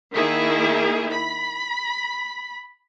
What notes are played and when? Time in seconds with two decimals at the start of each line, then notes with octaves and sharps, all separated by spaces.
0.14 D#3 A#3 E4 G#4
1.11 B5